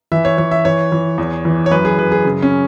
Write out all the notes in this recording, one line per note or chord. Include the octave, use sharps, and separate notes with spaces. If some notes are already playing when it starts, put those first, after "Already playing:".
E3 E5
C#5
E3 C#5
E5
E3 C#5
E3
E2
E3
C#5
F#2 B4
G#4
F#2 B4
G#4
C#3
C#4